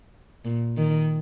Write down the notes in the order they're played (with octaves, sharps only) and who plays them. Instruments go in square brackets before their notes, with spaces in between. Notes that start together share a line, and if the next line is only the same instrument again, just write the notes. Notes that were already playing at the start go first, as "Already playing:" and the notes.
[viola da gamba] A#2
D#3